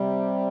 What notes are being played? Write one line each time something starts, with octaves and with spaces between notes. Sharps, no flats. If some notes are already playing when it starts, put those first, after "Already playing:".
Already playing: C3 G3